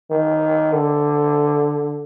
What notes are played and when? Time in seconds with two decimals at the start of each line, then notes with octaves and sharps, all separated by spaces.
0.11 D#3
0.73 D3